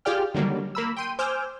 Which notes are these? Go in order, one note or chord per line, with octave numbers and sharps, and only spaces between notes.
F4 G4 G#4 D5 G5 F6
D3 D#3 F#3 G3 A#3
A#3 B5 E6
G5 C6 D#7
C5 G#5 D6 E6 F6 G6